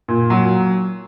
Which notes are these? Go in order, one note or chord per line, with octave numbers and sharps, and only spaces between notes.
A#2
F#3